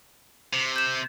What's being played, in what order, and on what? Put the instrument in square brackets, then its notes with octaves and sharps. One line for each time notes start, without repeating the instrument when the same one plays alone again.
[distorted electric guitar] C3
[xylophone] G6 E7